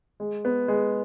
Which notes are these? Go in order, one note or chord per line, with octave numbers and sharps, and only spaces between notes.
G#3
B3
G#3